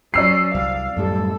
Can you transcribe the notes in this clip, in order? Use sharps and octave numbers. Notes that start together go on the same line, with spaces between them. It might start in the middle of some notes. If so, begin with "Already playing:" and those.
F#3 C#4 D5 E6 C7
C2 F5
F#2 A2 G3 A4